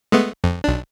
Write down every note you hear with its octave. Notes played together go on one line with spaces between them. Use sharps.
G#3 A3 B3
F2
B1 D4